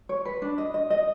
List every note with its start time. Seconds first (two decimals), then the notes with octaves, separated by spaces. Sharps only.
0.09 C#5
0.25 B4
0.42 D4
0.58 D#5
0.74 D#5
0.90 D#5